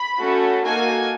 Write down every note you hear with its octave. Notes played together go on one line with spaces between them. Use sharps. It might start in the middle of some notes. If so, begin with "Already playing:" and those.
Already playing: B5
A3 C#4 F#4 A4
A#3 D#4 F#4 A4 G#5